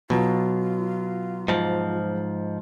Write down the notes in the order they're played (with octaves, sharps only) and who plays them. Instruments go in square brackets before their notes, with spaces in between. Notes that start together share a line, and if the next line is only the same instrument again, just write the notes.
[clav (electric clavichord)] B2 [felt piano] F#3 [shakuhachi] F4
[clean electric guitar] G#2 F3